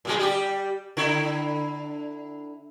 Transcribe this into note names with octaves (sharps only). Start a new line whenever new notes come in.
A#2 G3 G#3
G3 G4
D3 E4